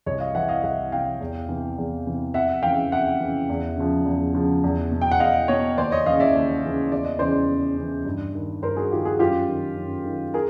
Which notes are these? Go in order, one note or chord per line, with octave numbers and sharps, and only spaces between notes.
C2 C#5 D#5
D#5 F5
C3 E3 E5 F#5
D#5 F5
C2 E5 F#5
C3 E3 F5 G5
E2
C3 E3
E2
C3 E3
F2 E5 F#5
C#3 E3 F5 G5
F2 E5 F#5
C#3 E3
E2
C#3 F3
E2
C#3 F3
E2
B2
G5
F#5
E2 D#5 F5
B2 C#5 D#5
D#2 C5 D5
C#5 D#5
C#3 E3 D#5 F5
D5 E5
D#2
C#3 E3
E2 D5
D#5
C#3 E3 C5 D5
E2
C#3 E3
G2
D#3
G2 A#4 C5
F#4 G#4
D#3 F4 G4
F#4 G#4
F#2 F4 G4
D#3
F#2
D#3
G#4 A#4